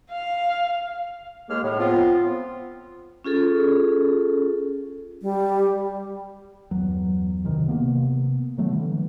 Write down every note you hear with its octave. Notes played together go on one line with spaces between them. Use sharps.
F5
D#2 G#3 A#3 G#4 F6
A2
F3 B3 C4 F4
C#4 F4 G#4 A4
G3
G1 E2 F#3
G#1 D2 C3 D#3
C3 A#3 B3
D#3 F#3 A3 B3
D3 E3 G3